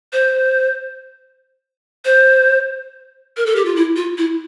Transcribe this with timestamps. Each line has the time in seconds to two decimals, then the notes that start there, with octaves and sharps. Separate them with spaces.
0.13 C5
2.05 C5
3.37 A#4
3.46 A4
3.56 G4
3.65 F4
3.76 E4
3.96 F4
4.18 E4